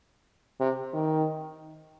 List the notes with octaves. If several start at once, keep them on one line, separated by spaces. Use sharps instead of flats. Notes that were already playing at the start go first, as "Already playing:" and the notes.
C3
D#3